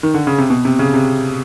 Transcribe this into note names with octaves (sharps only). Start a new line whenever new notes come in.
D#3
D3
C#3
C3
B2
C3
C#3
C3